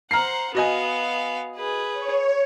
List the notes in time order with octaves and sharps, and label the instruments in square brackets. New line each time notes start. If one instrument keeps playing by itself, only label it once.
[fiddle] C5 F#5 [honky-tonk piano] A#5 F6 C7
[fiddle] B3 F5 [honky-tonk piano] F#4 D#5 G#5
[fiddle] G#4 B4
[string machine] C#5